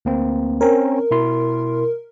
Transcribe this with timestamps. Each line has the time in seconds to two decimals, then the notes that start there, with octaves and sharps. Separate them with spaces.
0.05 D2 A#3 C4
0.61 C4 C#4 A#4 C#5
1.11 B2 E4 C6